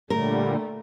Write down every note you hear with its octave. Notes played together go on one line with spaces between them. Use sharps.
A#2 D3 G3 A3 A#4